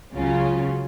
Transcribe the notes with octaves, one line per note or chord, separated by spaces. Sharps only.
C#2 C#3 F#3 C#4 F4